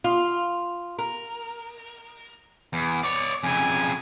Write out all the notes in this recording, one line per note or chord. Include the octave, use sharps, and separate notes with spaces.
F4
A#4
E2
C#5 D5
F2 C#3 G#5